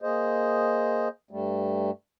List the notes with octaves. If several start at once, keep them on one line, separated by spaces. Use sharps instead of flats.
A#3 G#4 C5 D#5
G2 G3 A3